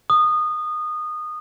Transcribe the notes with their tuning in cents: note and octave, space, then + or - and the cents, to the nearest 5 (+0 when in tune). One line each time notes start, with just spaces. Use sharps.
D#6 -20